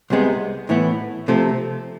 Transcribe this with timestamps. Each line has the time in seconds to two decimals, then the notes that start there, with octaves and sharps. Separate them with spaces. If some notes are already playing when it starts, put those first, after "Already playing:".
0.10 C2 C3 G#3 B3
0.69 A2 E3 B3
1.28 C3 F3 A3